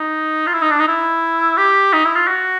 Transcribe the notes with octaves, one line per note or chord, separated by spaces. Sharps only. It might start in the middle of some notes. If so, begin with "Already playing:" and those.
Already playing: D#4
F4
E4
D#4
D4
D#4
E4
G4
D#4
E4
F4
F#4